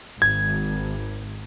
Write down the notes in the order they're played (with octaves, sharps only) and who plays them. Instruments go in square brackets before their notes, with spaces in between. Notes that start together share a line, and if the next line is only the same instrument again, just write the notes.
[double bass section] G#1 [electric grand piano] G#6